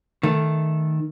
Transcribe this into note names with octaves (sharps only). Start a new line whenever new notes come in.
D#3 A3